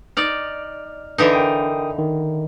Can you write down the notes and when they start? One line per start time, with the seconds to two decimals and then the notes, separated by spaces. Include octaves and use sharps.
0.17 D#4 D5 F6
1.18 D3 E3 D#4
1.33 A#4 G5 D#6
1.98 D#3